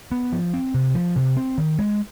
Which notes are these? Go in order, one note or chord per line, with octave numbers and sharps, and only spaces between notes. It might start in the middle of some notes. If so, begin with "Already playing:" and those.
B3
F3
C4
C3
F3
C3
C4
D#3
G#3